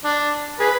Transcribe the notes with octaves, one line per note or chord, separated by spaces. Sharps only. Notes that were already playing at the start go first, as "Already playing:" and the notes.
D4
G#4 B4